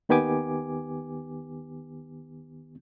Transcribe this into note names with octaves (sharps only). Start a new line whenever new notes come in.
D#2 D#3 B3 G4 G#5 D6